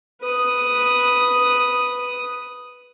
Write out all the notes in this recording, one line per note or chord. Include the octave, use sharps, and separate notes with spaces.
B4 D#6